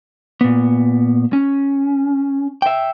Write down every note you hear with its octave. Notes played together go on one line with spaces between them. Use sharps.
A#2 B3
C#4
E5 G5